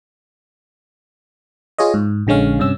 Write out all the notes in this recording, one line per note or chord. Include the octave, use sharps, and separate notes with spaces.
F4 G#4 C#5 D#5
G#2
A#1 D3 G#3 C#4 F5
G2 C3 C#4 E6